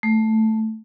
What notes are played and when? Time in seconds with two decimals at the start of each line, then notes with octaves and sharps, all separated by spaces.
0.03 A3